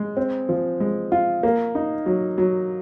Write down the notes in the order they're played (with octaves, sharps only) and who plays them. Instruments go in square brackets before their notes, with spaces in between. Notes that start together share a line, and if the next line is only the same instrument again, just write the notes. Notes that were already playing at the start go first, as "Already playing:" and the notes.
Already playing: [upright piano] G#3
C4
F3
G#3
F4
A#3
D#4
F#3
F#3